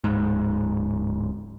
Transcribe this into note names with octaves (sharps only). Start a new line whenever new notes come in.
D1 G#2